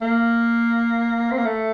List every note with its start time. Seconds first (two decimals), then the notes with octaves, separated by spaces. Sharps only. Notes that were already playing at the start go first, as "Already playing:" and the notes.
0.02 A#3
1.31 C4
1.38 A#3
1.45 A3